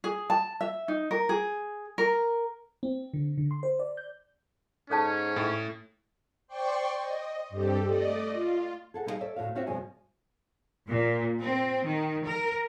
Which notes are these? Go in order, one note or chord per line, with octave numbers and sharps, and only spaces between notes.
G#4
A5
E5
D#4
A#4
G#4
A#4
C4
D3
D3
C6
C5
D5
G6
G#2 C#4 A4 C#5 A5
A2
C5 D5 G5 C6 C#6
D#5
G2 C4 G4 A4
A3 D5 D#5
F4
G#4 A4 F#5
G3 D#4 E4 G#4 D#5 F5
A4 C#5 D5 E5
D2 A2 F#4 F5
C4 C#4 F4 F#4 C#5 E5
G2 B2 F3 G#3 G#5
A#2
C4
D#3
A#4